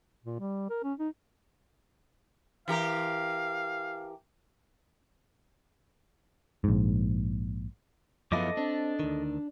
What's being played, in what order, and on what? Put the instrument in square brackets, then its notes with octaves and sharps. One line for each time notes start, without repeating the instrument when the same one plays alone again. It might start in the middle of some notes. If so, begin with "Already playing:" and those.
[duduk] A#2
G3
A#4
C#4
D#4
[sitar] E3 G4 A#4 [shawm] F5
[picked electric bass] A#1 G#2
[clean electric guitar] F#2 E4 F5 [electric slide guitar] F3 B3 [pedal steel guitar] A4 D#5 D6
[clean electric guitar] C4 [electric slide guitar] D4
[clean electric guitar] D2 D#3